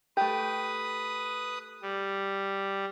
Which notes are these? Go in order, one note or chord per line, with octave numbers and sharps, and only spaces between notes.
A3 G4 B4 D#6
G3